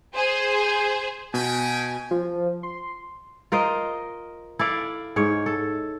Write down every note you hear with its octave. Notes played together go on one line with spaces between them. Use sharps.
G#4 C5
B2 F#4 B4 G5 G#5
F3
C6
F4 A#4 C5 D#5
E4 A4 D5 F5
G#2 C#5
A4